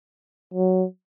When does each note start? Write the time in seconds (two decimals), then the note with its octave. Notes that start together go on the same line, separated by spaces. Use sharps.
0.54 F#3